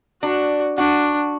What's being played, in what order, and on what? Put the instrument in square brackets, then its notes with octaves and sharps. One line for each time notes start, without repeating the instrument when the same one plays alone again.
[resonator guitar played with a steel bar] D4 [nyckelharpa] F#4
[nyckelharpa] D4 [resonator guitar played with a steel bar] F#4